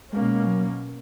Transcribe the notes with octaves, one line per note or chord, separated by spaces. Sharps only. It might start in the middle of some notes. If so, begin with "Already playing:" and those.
B2 G#3 A#3 C#4
F#3